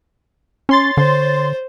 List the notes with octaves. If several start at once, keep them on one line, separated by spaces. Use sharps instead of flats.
C#4 C#5 C6 A6
D3 C5